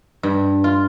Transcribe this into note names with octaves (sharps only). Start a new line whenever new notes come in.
G2
F4